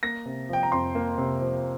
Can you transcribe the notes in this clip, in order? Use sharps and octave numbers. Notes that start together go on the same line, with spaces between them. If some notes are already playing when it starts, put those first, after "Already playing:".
A#3 A#6
C3
F3 G5
A#5
F2 C6
A#3
C3
F3